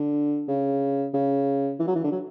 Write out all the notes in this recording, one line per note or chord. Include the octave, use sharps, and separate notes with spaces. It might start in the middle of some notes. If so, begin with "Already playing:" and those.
Already playing: D3
C#3
C#3
E3
F#3
E3
D3
F#3